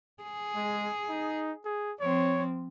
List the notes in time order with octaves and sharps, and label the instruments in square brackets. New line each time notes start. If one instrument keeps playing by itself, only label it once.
[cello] G#4
[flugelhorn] G#3
D#4
G#4
[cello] F3 C4 [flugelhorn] C#5